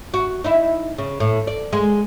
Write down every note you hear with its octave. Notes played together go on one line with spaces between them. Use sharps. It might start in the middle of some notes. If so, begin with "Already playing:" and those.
F#4
D#4 E4
C#3
A2
D5
G#3